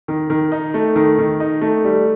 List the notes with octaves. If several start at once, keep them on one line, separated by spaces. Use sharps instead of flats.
D#3
D#3
D#4
A3
D#3
D#3
D#4
A3
G3